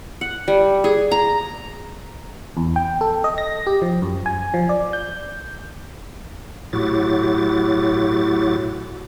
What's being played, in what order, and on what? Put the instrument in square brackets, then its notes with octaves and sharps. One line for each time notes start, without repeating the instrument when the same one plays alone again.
[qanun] F#5
G3
G#4
A#5
[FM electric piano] E2
G5
A4
D#5
A#6
G4
F3
F#2
G#5
F3
D5
G6
[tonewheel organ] A2 F#3 E4 F#4 G4 A6